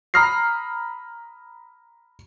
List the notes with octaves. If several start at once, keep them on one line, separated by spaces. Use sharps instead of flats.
A#5 B5 D#6 F6 A#6 C7